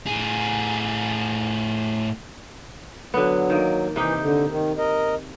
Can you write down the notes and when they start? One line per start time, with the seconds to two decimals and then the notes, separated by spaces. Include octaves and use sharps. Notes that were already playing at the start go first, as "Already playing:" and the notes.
0.06 A2 G#4
3.14 D3 F#3 B3
3.50 D#3 A#3
3.96 C3 E3 D#4 G4
4.21 D3
4.49 D#3
4.78 A#4 D#5